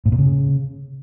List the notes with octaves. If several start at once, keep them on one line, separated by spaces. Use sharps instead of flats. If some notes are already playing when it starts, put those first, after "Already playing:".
A2
A#2
C#3